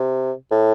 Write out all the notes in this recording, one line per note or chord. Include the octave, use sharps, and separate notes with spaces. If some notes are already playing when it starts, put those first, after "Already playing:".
Already playing: C3
A2